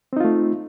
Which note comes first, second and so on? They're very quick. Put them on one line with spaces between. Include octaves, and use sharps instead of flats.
C4 D#4 F4 A3